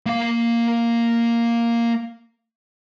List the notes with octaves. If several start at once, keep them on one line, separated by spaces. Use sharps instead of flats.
A#3 F5